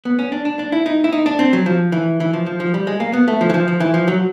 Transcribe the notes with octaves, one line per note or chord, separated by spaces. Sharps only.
B3
C#4
D4
D4
D4
E4
D#4
E4
D#4
D4
C4
F#3
F3
E3
E3
F3
F3
F3
G3
G#3
A#3
B3
A3
F3
E3
F3
F3
E3
F3
F#3